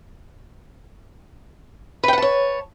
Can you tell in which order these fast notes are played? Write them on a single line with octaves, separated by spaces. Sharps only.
B4 G5 F#5 A5 C#5